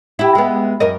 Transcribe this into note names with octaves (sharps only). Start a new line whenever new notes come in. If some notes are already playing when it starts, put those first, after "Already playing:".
E4 G4
G#3 B3
F#2 A#4 D#5